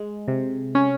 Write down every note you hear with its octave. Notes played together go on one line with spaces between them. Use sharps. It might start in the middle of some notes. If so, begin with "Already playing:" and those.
Already playing: G#3
C3
C#4